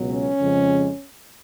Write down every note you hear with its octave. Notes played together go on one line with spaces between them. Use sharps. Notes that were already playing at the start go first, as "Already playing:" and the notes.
Already playing: C#2 B2 F#3
C#4
F2 C#3 F3 G#3